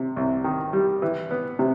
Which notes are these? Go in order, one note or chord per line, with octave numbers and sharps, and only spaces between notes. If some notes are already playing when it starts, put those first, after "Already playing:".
Already playing: C3
C2
D#3
G3
E3
B3
C3